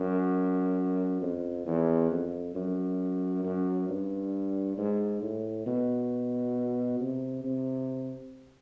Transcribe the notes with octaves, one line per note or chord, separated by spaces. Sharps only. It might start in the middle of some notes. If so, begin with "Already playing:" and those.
Already playing: F#2
F2
E2
F2
F#2
F#2
G2
G#2
A2
B2
C3
C3